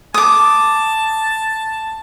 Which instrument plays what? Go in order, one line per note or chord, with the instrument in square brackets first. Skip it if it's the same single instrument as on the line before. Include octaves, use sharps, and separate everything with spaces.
[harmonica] A5 [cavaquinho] D6 D#6